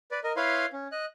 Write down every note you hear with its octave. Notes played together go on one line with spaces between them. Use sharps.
B4 D5
A#4 D#5
E4 B4 C#5 F5 C6
C#4
D#5 F#6